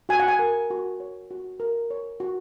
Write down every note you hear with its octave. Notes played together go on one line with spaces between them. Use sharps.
F#4 G#5
F#5
G#5
A#4
F#4
C#5
F#4
A#4
C#5
F#4